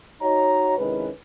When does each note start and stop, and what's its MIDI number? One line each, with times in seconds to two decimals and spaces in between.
0.22 0.76 63
0.22 0.76 66
0.22 0.76 73
0.22 0.76 82
0.78 1.09 48
0.78 1.09 51
0.78 1.09 56
0.78 1.09 61
0.78 1.09 64
0.78 1.09 71